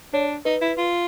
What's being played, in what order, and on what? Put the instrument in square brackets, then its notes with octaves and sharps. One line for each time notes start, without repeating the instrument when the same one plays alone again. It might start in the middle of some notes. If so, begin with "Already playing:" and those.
[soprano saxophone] D4 [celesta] C#5
[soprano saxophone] D#4 [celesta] B4
[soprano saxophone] E4
F4